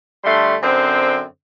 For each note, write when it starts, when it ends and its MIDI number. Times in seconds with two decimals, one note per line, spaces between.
0.24 0.55 50
0.24 0.55 55
0.24 0.55 57
0.24 0.55 84
0.62 1.23 42
0.62 1.23 50
0.62 1.23 60
0.62 1.23 72
0.62 1.23 79